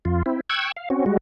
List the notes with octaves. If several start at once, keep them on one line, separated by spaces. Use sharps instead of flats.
F2 F4
C4 E4
G5 C#6 E6 F#6 G#6
F5
C4 C#4 F#4
G3 G#3 F#4